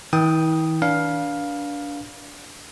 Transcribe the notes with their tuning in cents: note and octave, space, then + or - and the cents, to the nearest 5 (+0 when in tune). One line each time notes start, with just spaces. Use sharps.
E3 -45 G5 +0 D#6 +0
D4 -25 B4 -35 F5 +10